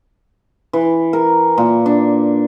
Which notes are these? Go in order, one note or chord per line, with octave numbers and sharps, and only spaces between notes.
E3
A#4
A#2
D4